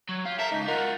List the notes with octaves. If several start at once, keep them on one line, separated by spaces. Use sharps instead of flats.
F#3 C#5
F4 G4
A4 A#4 E5
C#2 D#4
F4 F#4 A#4 F#5